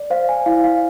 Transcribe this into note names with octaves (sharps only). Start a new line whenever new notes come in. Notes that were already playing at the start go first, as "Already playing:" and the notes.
Already playing: D5
C5 F5
G#5
E4 F5
F5